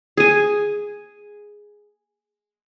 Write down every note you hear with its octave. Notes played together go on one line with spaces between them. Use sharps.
G#4 G#5